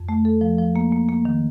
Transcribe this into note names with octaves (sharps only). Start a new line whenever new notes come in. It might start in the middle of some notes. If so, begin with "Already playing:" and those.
Already playing: F2
A3
A4
F3
F3
A#3
A#3
A#3
D#3